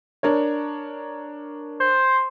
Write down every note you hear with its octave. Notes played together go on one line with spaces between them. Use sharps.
D4 A#4 C#5
C5